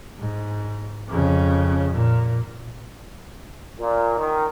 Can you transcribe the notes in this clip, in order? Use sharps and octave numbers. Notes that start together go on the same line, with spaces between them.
G#2
F2 C#3
A#2
A#2
D#3